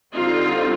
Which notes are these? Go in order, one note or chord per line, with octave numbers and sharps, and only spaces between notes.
D3 G3 C4 D#4 F4